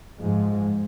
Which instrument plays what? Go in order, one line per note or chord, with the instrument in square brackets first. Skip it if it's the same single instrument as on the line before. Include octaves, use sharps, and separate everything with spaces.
[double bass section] G#2 F3 G#3